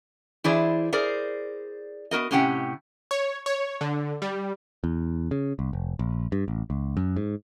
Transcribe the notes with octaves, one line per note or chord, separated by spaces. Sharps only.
E3 E4 G#4 C5 D5
G#4 A#4 C5 D5
B3 F#4 A#4 D#5
A2 C3 C#4 G4 F#5 G5
C#5
C#5
D3
G3
E2
C#3
C2
F1
A#1
G2
A1
C#2
F#2
G#2